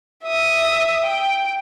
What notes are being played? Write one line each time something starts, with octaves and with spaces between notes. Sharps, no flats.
E5 D#6
G5